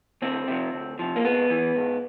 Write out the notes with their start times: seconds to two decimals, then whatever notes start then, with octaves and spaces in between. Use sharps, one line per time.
0.22 D2 C4
0.48 C3 F3
0.74 D2
0.99 C3 F3
1.16 A#3
1.24 G#2 B3
1.50 E3
1.76 G#2